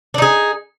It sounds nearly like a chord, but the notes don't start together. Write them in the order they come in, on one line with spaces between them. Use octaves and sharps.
D4 D#4 G#4